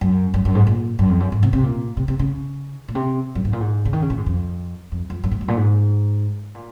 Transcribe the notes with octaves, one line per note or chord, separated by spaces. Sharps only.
F#2
F#2
F#2
G#2
A#2
F#2
F2
F#2
G#2
C3
C3
A#2
C3
C3
C#3
A#2
C3
F#2
G#2
A#2
G#2
C#3
D#3
C#3
A#2
G#2
F2
F2
F2
F#2
G#2
F#2
A#2
G#2
A#2